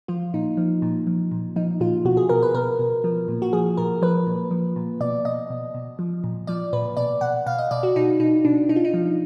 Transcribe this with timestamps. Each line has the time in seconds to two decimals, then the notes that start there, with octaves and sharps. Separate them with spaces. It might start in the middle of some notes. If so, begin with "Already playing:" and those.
0.08 F3 F4
0.34 A#2 D#4
0.57 F3
0.82 A#2
1.07 F3
1.31 A#2
1.56 F3 D#4
1.80 A#2 F4
2.05 B2 F#4
2.17 G#4
2.29 B2 A#4
2.43 B4
2.54 B2 A#4
2.79 B2
3.04 F3
3.28 A#2
3.42 F#4
3.53 F3 G#4
3.77 A#2 A#4
4.02 F3 B4
4.27 A#2
4.51 F3
4.76 A#2
5.01 B2 D5
5.25 B2 D#5
5.50 B2
5.74 B2
5.99 F3
6.24 A#2
6.47 F3 D5
6.73 A#2 B4
6.97 B2 D5
7.21 B2 F#5
7.46 B2 F5
7.58 D#5
7.71 B2 D5
7.83 F#4
7.96 B2 D#4
8.20 B2 D#4
8.45 B2 D4
8.69 B2 D#4
8.76 F4
8.85 D#4
8.94 F3